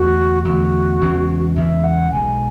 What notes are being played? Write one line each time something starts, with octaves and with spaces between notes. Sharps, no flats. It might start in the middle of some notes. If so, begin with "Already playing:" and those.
Already playing: E2 D3 A3 F#4
E2 D3 A3 F#4
E2 C#3 E3 G#3
E2 C#3 E3 G#3 E5
F#5
B1 B2 G#3 G#5